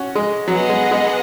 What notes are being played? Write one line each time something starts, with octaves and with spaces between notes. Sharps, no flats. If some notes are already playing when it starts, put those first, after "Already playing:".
Already playing: C#4 F#4
G#3
F#3 B3 G#4 D#5 F#5
G#3
G#3